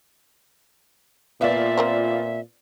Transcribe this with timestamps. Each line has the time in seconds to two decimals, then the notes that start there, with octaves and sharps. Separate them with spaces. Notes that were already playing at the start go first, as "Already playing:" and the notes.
1.41 A#2 B3 F4 D5 E5
1.78 C4 A#4 C5